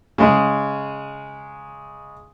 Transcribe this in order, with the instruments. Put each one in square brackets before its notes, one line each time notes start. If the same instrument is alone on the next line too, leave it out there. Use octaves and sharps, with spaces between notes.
[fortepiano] C#3 G#3